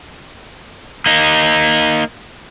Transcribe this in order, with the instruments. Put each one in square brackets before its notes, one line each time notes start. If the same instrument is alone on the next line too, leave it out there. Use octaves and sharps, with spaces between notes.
[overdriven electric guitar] A#3 D#4